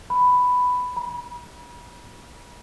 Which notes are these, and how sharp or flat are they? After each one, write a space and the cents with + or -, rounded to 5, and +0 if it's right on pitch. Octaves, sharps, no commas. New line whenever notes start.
B5 +5
B5 -40